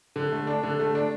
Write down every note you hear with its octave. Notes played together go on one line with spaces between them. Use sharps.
D3
A3
D4
D3
A3
D4